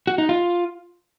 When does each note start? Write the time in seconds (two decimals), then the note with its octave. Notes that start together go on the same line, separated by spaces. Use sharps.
0.07 F#4
0.18 D#4
0.29 F4